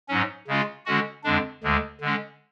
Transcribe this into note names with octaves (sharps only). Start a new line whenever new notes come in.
G#2 F#3 C#4
C#3 G#3 C#4 F4
D3 G#3 C#4 F#4
F2 D3 G#3 D4
D2 D3 G#3
D3 G#3 C#4